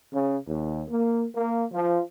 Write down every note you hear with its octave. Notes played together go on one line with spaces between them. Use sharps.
C#3
D#2
A#3
A#3
F3